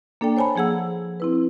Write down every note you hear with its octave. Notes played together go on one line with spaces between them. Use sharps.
A#3 D4 A4 D5 G5
C5 C#5 G#5 A5 B5
F3 A#3 G#4 F#5 E6
C4 E4 B4